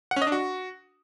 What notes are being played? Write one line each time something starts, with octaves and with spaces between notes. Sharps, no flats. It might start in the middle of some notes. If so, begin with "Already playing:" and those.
F#5
C#4
D#5
D4
F#4